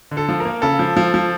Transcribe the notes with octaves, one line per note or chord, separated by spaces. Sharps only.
D3
A4
F3
A#3 A#4
C#3 A4
F3
F3
F3